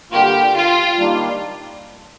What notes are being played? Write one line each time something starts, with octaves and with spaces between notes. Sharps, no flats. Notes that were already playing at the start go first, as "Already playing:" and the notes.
D3 G3 A#3 F4 G4
F4
D#3 G3 A#3 D4